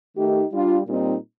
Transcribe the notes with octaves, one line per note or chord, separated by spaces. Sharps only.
D#3 A3 D#4 G4
G3 D4 F4
A#2 G3 C4 D#4